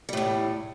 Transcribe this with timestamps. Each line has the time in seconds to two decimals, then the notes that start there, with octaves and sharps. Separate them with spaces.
0.09 G3
0.13 A2
0.17 E2